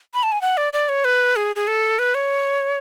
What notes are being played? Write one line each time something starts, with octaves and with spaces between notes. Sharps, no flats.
B5
A5
G#5
F#5
D5
D5
C#5
B4
G#4
G#4
A4
B4
C#5